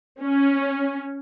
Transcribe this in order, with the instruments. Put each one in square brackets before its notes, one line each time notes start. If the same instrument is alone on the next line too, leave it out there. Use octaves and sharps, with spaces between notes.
[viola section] C#4